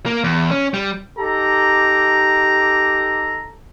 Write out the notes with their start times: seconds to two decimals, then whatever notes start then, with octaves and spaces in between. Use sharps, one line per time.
0.06 A#3
0.24 E2
0.51 C#4
0.74 G3
1.18 D#4 G4 A4 A#5